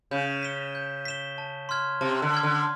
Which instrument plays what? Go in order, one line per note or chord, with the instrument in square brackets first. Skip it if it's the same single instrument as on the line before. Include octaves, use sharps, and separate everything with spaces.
[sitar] C#3 [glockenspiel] G6
[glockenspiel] B6 E7 G7
G6
B6 E7 G7
A5
C6 F6 G#6
[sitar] C3 [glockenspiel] A5
[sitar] D3
[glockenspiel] C6 F6 G#6
[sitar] D3